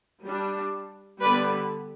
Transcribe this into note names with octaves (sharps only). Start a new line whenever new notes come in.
G3 D4
D3 G3 B3 B4 D5